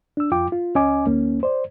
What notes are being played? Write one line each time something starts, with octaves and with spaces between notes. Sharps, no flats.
D4 E6
F2 F4 G5 D6
F4
C#2 C#4 D#5 G#5 D6
D2 A#3 C#4
C5 D5